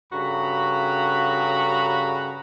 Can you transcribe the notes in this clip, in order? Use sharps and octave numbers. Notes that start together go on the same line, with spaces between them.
G2 C#3 F#4 A4 A#5 B5